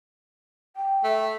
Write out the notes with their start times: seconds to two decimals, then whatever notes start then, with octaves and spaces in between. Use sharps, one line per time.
0.76 G5
1.04 A3